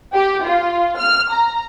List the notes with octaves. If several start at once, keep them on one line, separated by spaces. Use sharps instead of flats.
G4
F4
F6
A#5